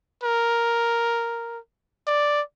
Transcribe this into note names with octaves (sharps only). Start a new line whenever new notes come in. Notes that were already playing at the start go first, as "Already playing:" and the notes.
A#4
D5